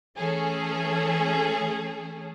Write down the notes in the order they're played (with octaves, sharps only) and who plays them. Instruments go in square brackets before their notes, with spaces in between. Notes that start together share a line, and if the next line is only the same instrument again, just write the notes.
[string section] E3 A3 C#4 G#4 A4